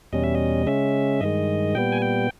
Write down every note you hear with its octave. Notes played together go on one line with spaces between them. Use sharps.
E2 B2 G3 C#4 D#5
E5
D#5
C#3 G#3 C#4 E5
G2 D#3 G#3 D#5
A#2 G3 B3 G5
G#5
G5